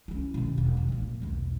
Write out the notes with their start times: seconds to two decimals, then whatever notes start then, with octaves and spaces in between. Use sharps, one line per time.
0.08 C#4 E4
0.34 B2 D#3
0.58 E1
0.77 C#3
0.89 A#2 A#3
1.22 B1 E2